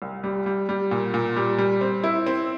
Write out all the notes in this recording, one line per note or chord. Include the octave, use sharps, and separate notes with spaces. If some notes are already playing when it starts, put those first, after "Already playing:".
C2
G3
G3
G3
A#2
A#2
G3
G3
C4
E4
C4